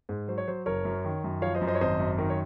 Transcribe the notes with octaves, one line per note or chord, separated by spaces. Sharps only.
G#2
F#3 C5
C#5
F#3 C5
F#1 A#4 C#5
F#2
D#3
F#2
F3 C#5 F5
C5 D#5
F#2
C5 D#5
C#5
G#1 C5 D#5
F#2
D#3 A#4
C#5